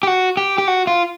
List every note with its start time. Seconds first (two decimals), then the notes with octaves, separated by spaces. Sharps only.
0.03 G4
0.07 F#4
0.37 G4
0.58 G4
0.68 F#4
0.87 F4